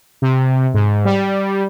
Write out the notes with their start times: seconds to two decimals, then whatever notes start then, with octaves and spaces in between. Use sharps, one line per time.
0.22 C3
0.74 G#2
1.05 G3